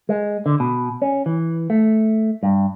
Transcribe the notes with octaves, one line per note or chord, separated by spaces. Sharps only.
G#3
D3
B2
C#4
E3
A3
G2